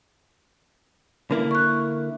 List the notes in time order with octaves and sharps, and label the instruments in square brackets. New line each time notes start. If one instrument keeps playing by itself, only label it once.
[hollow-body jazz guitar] D3 A#3 E4
[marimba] C#6 F#6